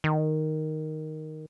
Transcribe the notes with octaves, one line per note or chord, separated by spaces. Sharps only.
D#3